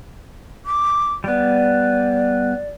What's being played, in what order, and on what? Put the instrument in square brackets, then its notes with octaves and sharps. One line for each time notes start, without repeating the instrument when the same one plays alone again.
[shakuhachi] D6
[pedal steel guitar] G3 B3 [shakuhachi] D5